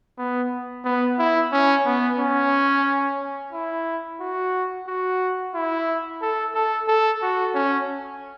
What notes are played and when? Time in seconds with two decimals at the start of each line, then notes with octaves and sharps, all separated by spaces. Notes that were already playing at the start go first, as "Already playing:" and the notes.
0.18 B3
0.85 B3
1.19 E4
1.52 C#4
1.86 B3
2.19 C#4
3.53 E4
4.21 F#4
4.88 F#4
5.54 E4
6.22 A4
6.55 A4
6.88 A4
7.22 F#4
7.55 C#4